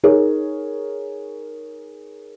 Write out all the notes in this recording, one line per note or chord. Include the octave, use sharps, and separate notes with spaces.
D#4 G#4 A#4 C#5